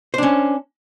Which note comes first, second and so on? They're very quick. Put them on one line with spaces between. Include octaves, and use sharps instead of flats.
C5 D4 C#4